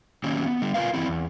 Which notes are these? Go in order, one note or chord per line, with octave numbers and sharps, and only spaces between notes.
D#3 F#3 A#3 C#4
B3
D3 G3
F4 G4 A#4 B4 F5
E3 C4 E4
E2